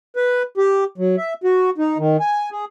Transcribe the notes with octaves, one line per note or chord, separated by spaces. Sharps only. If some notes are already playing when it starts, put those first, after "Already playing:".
B4
G4
F#3
E5
F#4
D#4
D#3
G#5
G#4